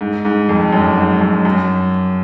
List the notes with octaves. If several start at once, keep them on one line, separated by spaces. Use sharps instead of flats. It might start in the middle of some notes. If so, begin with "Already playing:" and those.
G#2
G#2
F2
F#2
G#2
F#2
F#2